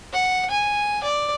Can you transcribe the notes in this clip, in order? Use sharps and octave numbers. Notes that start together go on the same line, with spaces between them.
F#5
G#5
D5